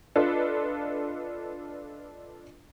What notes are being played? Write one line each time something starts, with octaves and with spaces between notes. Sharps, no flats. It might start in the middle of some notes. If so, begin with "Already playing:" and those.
D4 F4 A4 B4 D#5